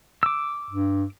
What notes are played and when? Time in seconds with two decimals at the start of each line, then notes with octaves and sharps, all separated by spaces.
0.23 D6 E6
0.71 G2